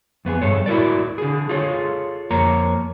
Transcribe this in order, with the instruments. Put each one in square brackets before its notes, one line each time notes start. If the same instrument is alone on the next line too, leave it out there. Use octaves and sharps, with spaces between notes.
[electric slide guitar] F2 B3 F4 G#4
G2 A4 C#5
E4 F#4 A#4 D5
D3 G#4
F4 G#4 A4 C#5
F2 A#3 C#5 A#5